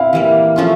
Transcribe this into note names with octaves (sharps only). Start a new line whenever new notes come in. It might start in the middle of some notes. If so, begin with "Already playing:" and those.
Already playing: C4 E4 F5
E3 G3 A#3
F3 A3 C#4 F4